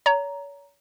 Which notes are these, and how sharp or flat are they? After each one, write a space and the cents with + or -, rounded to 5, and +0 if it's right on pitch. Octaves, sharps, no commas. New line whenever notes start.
C#5 +35 A#5 +0